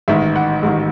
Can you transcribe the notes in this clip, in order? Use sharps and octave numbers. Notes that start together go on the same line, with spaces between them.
A1 G#2 D#3 E5
F#5
A1 G#2 D#3